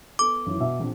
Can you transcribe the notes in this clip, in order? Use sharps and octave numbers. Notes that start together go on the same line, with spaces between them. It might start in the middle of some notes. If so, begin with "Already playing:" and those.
B3 A4 D6
F#2 D#3 E3
B2 E5
A#1 C4 D4